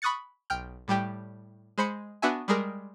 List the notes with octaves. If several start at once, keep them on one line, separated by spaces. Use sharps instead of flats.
B5 C#6 D#6 F#6 A6 C#7
B1 G5 F6 G6
A2 G3 G4 G5
G#3 C5 B5 C#7
B3 D4 F#4 E5 G#5
G3 G#3 G#4 A#4